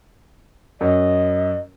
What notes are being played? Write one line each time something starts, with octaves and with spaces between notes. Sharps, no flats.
F#2 D#5